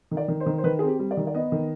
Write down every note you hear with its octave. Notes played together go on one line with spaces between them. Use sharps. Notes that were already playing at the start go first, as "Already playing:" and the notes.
D#3
D5
D#3
C5
D#3
C5
D#3 B4
C4 G#4
G4
G3
D5
D#3
D5
B3 D#5
D#3